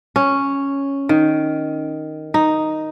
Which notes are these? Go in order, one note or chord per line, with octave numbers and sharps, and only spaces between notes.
C#4
D#3
D#4